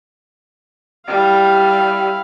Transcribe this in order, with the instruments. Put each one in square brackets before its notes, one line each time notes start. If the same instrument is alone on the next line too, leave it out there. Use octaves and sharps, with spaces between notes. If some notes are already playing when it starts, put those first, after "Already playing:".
[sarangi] G3 [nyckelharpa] E4 F5